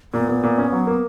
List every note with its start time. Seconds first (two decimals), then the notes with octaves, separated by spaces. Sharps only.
0.13 A#2 B3
0.28 A#2
0.43 A#2
0.58 C#4
0.72 F#3
0.87 A#3